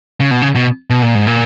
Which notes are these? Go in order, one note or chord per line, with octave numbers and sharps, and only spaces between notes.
C#3
B2
C#3
B2
B2
A#2
G#2
A#2